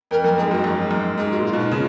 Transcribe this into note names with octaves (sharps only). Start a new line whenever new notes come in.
F2 A#4
F#2 A#4
G#2 G#4
F#2 F#4
F#2
G#2
F#2
G#2 G#4
F#4
A#2
F4
B2 D#4
C#3 F4